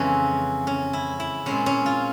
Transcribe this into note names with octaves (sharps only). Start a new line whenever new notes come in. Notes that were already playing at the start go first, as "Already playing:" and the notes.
Already playing: F2 C#3 E3 G#3 C4 C#4
C#4
E4
E4
A#2 G#3 C4 C#4
C#4
F4